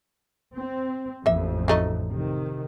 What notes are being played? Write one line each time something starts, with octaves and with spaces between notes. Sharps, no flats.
C4
A1 F2 A#3 E5
F#3 A3 D#4
C3 D#3